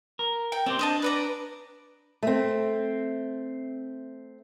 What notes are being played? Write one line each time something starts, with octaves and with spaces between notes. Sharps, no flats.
A#4
G5
C4 G4 C5 D5
D4 C5 D#5 A5
B4 D5 A#5
A3 C4